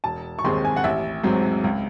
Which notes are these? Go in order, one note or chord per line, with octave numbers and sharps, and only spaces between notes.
E1 A5
C#6
D#2 D#3 G#3 C4 C6
G#5
F#5
A1 E5
G#2 F#3 C4
C#2